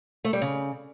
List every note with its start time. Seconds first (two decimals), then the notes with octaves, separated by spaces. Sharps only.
0.25 A3
0.33 G3
0.42 C#3